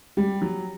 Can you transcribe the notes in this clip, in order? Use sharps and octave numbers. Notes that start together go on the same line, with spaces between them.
G3
F#3